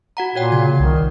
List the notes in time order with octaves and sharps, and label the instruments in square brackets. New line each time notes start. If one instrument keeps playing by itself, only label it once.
[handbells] F#4 F#5 A#5
[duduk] A#2 [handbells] F#4 C#5 G5
[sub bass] C#3 [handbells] G#6
[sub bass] C2 [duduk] D#3